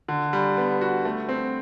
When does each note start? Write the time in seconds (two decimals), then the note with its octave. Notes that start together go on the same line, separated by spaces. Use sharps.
0.08 D3
0.33 G3
0.57 B3
0.81 F#4
1.05 A3
1.29 C4